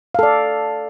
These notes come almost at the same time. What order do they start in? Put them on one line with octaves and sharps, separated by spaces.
F5 A4 D5